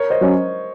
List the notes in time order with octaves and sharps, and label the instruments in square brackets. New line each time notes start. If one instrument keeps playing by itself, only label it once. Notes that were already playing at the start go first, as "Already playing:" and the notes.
Already playing: [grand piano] A#4 C#5
C5 D#5
[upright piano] F#3 C#4